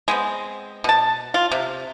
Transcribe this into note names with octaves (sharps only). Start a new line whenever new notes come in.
G#3 B3 C4
B2 A5
F4
C3